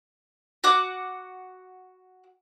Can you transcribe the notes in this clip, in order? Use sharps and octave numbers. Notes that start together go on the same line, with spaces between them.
F#4 F#5 D6